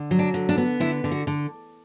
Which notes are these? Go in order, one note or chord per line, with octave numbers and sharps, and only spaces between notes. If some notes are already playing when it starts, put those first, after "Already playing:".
Already playing: D3
F#3
D4
D3
D4
B3
D3 E4
D3
F#4
D3